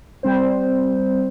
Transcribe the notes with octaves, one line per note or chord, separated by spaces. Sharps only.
G3 C4 C5